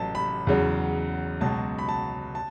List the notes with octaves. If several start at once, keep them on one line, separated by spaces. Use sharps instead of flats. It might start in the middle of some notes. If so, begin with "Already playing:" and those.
Already playing: A1 A2 F#3 A5
B5
E2 C#3 F#3
C#2 B2 F#3 A5
B5
A5
A5